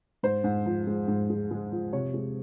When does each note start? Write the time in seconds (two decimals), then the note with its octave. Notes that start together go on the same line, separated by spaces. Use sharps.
0.23 G#2 C5
0.44 G#2
0.66 F3
0.87 G#3
1.08 G#2
1.30 G#3
1.51 G#3
1.72 F3
1.93 C3 C#5
2.14 G#3